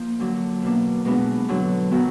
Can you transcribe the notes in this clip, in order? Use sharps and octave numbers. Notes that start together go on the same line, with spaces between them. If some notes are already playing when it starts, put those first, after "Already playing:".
Already playing: F3 A#3
D3 F#3 D4
B2 A#3 D4
B2 G#3 B3 D4
D3 F#3 D4
D#3 F#3 B3